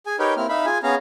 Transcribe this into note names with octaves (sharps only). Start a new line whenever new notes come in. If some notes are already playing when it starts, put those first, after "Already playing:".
G#4 G#5
D#4 G4 A#4 B4 C#5 G5
A#3 C4 E4 F6
D#4 E5 F5 B5
F4 G#4 G#5
B3 C#4 G#4 F5 A#5